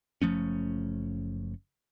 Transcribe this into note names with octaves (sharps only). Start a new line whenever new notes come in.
F#1 F3 A3 C#4